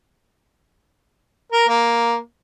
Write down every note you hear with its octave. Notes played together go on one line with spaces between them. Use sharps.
A#4
A#3